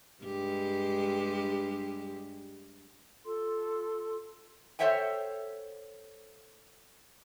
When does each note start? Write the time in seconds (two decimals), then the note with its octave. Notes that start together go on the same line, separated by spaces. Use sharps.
0.23 G2 G#3 G4
3.25 F4 A4 C6
4.79 A4 C5 C#5 E5 F#5 G5